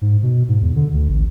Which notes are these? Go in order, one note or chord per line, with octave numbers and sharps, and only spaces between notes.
G#2
B2
G#2
E2
D3
D2
A1